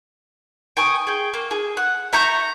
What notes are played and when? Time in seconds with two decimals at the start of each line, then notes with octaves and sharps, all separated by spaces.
0.77 G5 G#5 C#6 D#6
1.07 G#4 G5
1.34 A#3
1.51 G#4
1.77 F#5
2.13 E5 A#5 C#6 G6